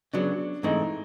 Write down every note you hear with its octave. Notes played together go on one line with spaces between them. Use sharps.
C#3 F#3 B3 D4
G#2 E3 A3 C4 D#4 E4